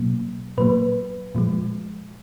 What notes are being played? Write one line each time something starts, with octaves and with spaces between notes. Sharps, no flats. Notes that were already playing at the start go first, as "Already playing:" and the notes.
Already playing: B2 F#3 A#3
A#2 F#3 A#3 B4
A#2 F3 G#3